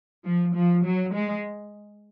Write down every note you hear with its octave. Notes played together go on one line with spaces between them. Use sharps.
F3
F3
F#3
G#3